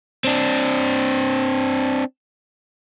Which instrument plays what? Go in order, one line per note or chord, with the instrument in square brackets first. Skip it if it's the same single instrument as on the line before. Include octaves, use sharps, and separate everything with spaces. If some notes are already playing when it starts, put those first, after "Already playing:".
[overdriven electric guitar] C4 D4